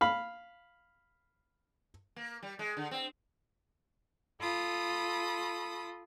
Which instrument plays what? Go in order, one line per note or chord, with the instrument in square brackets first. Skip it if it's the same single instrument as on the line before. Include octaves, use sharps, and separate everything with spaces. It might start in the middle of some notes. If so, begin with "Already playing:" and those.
[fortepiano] F5 B5
[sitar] A#3
G3
G#3
D3
C4
[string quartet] F4 A4 B5 D#6